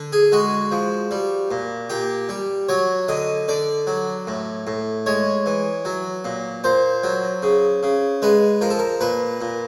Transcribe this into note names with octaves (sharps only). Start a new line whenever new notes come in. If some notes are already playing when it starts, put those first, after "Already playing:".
Already playing: D3
G#4
G#3 F#4
F3
G3
A#2
A#2 G4
G3
F#3 C#5
D3 D#5
D3 D5
F#3
A2
A2
G#3 C#5
E3
F#3
A#2
A#2 C5
F#3
C#3
C#3
G#3 B4
F3 A#4
A4
A#4
A#2 B4
A#2